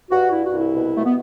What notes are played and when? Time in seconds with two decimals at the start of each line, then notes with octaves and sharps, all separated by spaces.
0.11 G2 F#4
0.31 G2 E4
0.45 F#4
0.53 C2 E4
0.74 B2
0.94 B2 A3
1.06 B3